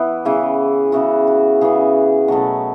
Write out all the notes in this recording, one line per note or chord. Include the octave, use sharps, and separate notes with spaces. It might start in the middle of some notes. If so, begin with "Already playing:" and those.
Already playing: E3 B3 E4
C#3 E3 B3
C#3 E3 B3 F#4
F#4
C#3 E3 B3 G#4
B2 F#3 A3 C#4